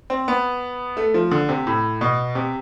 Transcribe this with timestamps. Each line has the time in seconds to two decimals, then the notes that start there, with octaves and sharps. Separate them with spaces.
0.10 C4
0.28 B3
0.97 A3
1.14 F3
1.31 D3
1.49 C3
1.67 A2
2.01 B2
2.35 C3